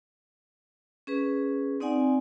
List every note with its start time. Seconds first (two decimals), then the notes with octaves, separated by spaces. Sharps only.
1.07 C#4 G#4 B4
1.80 C4 D#4 D5 F#5 G#5